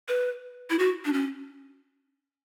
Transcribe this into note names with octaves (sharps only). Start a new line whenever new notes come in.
B4
E4
F#4
D4
C#4